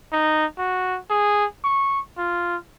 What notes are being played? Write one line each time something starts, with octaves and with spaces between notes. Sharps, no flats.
D#4
F#4
G#4
C#6
F4